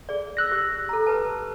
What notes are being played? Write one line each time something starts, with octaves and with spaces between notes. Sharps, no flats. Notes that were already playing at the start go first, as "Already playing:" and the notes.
G#4 D5
E6 F#6 A#6
G4
A4 A#5
G4 B4 A5